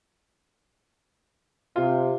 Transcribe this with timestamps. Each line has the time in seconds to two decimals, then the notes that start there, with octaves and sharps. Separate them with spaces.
1.76 C3 F4